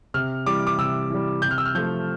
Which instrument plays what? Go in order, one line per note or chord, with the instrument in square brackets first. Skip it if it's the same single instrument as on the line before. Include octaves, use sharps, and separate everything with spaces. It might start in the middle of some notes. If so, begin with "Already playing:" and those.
[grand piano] C3 F6
E3 G3 D6
D6
C3 E6
E3 G3
C3 G6
F6
E6
F6
F3 A3 G6